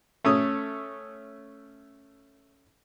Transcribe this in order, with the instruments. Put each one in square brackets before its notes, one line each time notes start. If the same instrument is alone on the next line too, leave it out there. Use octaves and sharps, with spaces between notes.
[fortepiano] A3 C#4 D#6